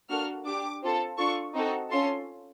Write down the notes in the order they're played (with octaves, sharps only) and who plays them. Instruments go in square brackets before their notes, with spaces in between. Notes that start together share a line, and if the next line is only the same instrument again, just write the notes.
[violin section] A#3 D4 F#4 A4 F6
D4 G4 D6
C4 F4 A4
D4 F4 A4 C#6
C4 D#4 F#4 A4
C#4 F4 A4 C6